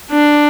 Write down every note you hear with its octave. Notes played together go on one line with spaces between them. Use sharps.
D4